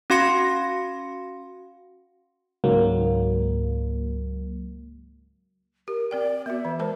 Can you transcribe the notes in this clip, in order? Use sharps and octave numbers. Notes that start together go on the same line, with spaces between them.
C#4 F#4 F5 C6 A#6 C#7
C#2 G#2 F#3 A#3
G4 A#4
C4 A#4 D5 G5
B3 F#4 E5
E3
G#3 A#4 C5 A5